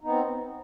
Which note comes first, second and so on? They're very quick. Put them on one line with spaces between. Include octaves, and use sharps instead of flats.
D#4 B3 C4